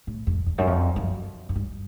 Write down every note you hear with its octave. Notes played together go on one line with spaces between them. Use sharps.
A2
F2
E2
F#2
F2
F#2
F#2
G2